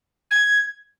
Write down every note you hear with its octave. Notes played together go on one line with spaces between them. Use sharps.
G#6